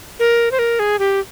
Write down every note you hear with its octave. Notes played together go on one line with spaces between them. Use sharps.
A#4
C5
A#4
G#4
G4